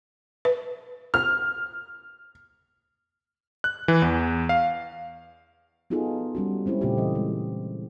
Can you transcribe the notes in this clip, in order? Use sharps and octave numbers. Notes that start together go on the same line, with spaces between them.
B4
F6
F#6
E3
E2
F5
B3 D#4 F4 F#4 G#4 A4
G3 C#4 F#4
G#3 C4 C#4 E4
A#2 C#3 A3 C4 F4 G4
E3 D#5
G#3